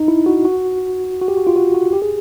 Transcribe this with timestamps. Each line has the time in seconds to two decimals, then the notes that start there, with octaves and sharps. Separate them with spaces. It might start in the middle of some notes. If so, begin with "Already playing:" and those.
Already playing: D#4
0.08 E4
0.26 F#4
0.45 F#4
1.21 F#4
1.28 G4
1.37 F#4
1.47 F4
1.56 F#4
1.74 F#4
1.93 G4
2.02 G#4